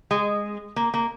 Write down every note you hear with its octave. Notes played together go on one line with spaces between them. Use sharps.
G#3
A#3
A#3